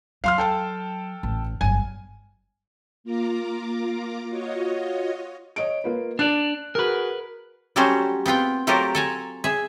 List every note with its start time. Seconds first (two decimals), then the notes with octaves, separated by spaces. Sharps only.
0.24 F#3 F5 C6 F6
0.38 A4 G5 A5
1.23 A1
1.61 G1 F#3 G#5
3.04 A#3 F4 A#5 D6
4.29 F4 F#4 C#5 D#5
5.56 C#5 D#5 D7
5.84 A#3 F4 B4
6.19 D4 D5 F#6
6.75 F#4 G#4 A#4 B4
7.76 F#3 G3 A3 C#4 F#4 C5
8.26 B3 C4 F4 G5
8.67 F#3 A3 F4 G4 A#4 C5
8.95 A4 G#5 A#5
9.44 G#4 E5